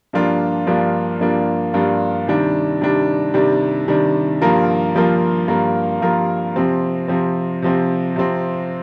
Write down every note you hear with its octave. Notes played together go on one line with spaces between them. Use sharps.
G2 F3 A#3 D4 F4
G2 F3 A#3 D4 F4
G2 F3 A#3 D4 F4
G2 F3 A#3 D4 F4
C3 D#3 G3 D4
C3 D#3 G3 D4
C3 D#3 G3 D4
C3 D#3 G3 D4
G2 F3 A#3 F4 A#4
G2 F3 A#3 F4 A#4
G2 F3 A#3 F4 A#4
G2 F3 A#3 F4 A#4
C3 F3 C4
C3 F3 C4
C3 F3 C4
C3 F3 C4